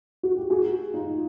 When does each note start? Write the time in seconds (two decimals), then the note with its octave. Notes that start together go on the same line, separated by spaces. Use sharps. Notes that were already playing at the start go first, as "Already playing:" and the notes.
0.23 F#4
0.37 G4
0.50 F#4 G#4
0.94 D#4 F4